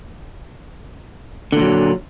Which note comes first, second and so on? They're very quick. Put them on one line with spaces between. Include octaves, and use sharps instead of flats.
D3 A#2 F#3